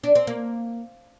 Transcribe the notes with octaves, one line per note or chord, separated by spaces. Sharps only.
D4
C4
A#3